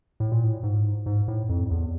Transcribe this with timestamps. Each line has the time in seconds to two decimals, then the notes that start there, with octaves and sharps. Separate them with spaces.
0.20 A2
0.32 A#2
0.44 A2
0.63 G#2
1.06 G#2
1.28 A2
1.49 F2
1.70 E2